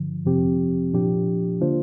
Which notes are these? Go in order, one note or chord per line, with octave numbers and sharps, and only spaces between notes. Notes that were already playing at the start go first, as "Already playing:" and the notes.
Already playing: G2 D3 F3
F2 C3 F3 C4 G4
A#2 F3 D4 G4
D3 A#3 D4 F4 C5